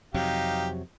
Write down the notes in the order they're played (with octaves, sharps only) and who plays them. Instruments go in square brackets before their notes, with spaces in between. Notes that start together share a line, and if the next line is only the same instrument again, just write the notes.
[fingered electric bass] F2 C3 F#3 [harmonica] D#4 G4 F5